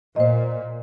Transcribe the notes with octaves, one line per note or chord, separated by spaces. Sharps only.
A#2 C5 D#5